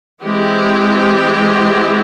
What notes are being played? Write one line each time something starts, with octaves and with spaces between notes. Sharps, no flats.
E3 G#3 C4 E4 G4